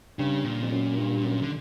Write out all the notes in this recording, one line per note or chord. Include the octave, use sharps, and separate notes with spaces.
G2 C#3
A#2
F2
F#2
G2
F#2
D3